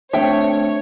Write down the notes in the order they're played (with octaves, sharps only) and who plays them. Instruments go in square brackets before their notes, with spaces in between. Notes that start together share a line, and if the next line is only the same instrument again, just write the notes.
[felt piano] A3 C4 D4 [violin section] C#5 [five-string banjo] E5 G5